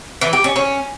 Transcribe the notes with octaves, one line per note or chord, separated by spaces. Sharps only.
E3
G4
C#4
C#4